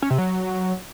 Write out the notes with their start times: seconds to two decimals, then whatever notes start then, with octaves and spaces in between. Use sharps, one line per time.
0.02 C#4
0.10 C3
0.18 F#3